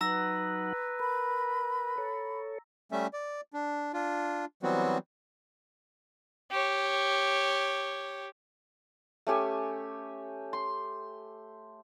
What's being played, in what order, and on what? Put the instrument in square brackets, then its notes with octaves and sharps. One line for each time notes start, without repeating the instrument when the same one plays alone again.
[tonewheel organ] F#3 D#4 F#5 [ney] B4 [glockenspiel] A#5 E6 A#6
[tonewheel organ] A#4 [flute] B5
[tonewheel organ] A4 C#5
[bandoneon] G3 A3 C#4 E5
D5
D4
D4 F4
E3 F#3 G3 B3 C4 F#4
[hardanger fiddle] G4 C#5
[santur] A3 C#4 G4 G#5
C6